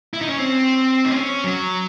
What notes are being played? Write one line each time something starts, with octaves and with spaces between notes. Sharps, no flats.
E4
D#4
C#4
C4
D#4
C#4
F#3